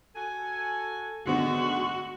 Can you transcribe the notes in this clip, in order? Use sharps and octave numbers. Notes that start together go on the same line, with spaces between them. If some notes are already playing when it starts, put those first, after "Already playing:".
F#4 A4 G#5
G#2 D3 B3 F#4